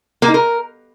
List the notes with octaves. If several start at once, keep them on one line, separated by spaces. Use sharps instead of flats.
A#3
D#4
A#4